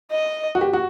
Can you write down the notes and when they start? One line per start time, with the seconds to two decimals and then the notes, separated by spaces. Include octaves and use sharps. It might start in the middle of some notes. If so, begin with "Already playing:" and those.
0.11 D#5
0.55 F#4
0.61 G4
0.73 F#4